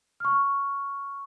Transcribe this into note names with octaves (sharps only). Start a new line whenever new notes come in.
C#6 F6